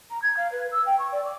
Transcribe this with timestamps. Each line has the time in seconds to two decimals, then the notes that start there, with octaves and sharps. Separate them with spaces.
0.10 A#5
0.22 G#6
0.36 F5
0.52 B4
0.71 E6
0.86 G5
0.99 C#6
1.12 D5
1.24 D6